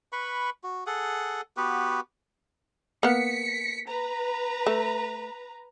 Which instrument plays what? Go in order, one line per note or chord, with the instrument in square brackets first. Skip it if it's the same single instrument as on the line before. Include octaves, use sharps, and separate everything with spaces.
[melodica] B4 B5 C#6
F#4
G#4 A4 F#5
B3 F#4 G4 B4
[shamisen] A#3 B3 [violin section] B6 C#7
[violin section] B4 A#5
[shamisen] A3